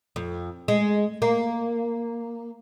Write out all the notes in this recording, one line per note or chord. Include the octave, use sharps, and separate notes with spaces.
F2
G#3
A#3